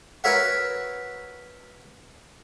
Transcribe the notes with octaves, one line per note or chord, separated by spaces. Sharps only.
F#4 A#4 B4 C#5 E5 F#5